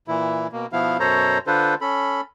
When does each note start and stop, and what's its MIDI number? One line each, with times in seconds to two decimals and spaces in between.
0.08 0.47 46
0.08 0.47 52
0.08 0.47 64
0.53 0.66 47
0.53 0.66 58
0.73 0.97 47
0.73 0.97 53
0.73 0.97 59
0.73 0.97 64
0.73 0.97 77
1.00 1.38 42
1.00 1.38 47
1.00 1.38 69
1.00 1.38 72
1.00 1.38 73
1.00 1.38 82
1.47 1.75 50
1.47 1.75 62
1.47 1.75 65
1.47 1.75 69
1.47 1.75 71
1.47 1.75 72
1.81 2.21 61
1.81 2.21 69
1.81 2.21 83